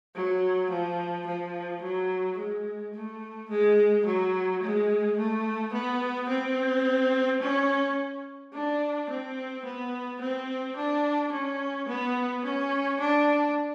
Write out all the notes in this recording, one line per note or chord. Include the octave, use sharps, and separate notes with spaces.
F#3
F3
F3
F#3
G#3
A3
G#3
F#3
G#3
A3
B3
C4
C#4
D4
C4
B3
C4
D4
C#4
B3
C#4
D4